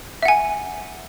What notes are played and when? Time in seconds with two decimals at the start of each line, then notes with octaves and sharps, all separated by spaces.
0.22 E5
0.25 F#5
0.28 G#5